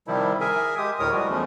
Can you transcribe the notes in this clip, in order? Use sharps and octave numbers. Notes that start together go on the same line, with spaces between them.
C3 D#3 F3 G3 E4
G#4 A#4 E5 G#5
G#3 G4 D#6
D2 A2 A#4 C#5 D#6
F3 G3 G#3 F#4
E2 F3 A3 C#4